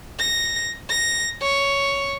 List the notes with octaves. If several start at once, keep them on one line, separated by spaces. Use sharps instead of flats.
A#6
A#6
C#5